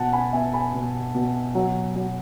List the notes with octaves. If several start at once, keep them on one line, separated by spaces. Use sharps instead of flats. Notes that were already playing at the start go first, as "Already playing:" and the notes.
Already playing: B2 F#5 A5
G#5 B5
B3 E5 G#5
G#5 B5
B2
B2
F#3
F#3